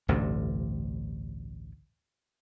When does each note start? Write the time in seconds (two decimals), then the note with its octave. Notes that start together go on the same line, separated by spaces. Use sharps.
0.08 A1 D2 G2 C3